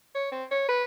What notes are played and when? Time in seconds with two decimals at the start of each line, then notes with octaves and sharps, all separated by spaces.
0.15 C#5
0.32 C4
0.51 C#5
0.68 B4